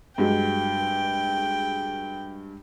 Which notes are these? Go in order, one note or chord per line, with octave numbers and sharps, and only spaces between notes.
G2 F#3 G#3 G5